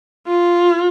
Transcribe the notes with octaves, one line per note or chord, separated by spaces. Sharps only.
F4